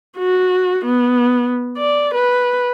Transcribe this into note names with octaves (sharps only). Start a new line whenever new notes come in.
F#4
B3
D5
B4